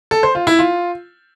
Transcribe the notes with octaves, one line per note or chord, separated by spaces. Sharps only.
A4
C5
F4
E4
F4